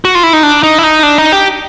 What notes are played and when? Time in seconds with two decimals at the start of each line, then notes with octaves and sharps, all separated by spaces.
0.05 F#4
0.15 F4
0.23 E4
0.33 D#4
0.43 D4
0.63 D#4
0.78 E4
0.84 D#4
1.03 D4
1.18 D#4
1.32 G4